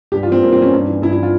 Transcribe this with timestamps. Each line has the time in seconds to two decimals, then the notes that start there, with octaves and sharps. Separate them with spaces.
0.12 G2 G4
0.23 F4
0.27 E3 C4
0.43 G2 A#3
0.53 C4
0.58 E3 C#4
0.73 G2
0.87 E3
1.02 G2 E4
1.13 E4
1.18 E3 F4